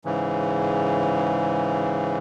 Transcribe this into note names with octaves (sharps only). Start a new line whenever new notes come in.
G#2 C#3 E3